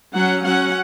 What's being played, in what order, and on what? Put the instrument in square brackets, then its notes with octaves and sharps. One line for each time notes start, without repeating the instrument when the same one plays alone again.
[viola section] F#3 C#4 F#5
F#3 C#4 F#5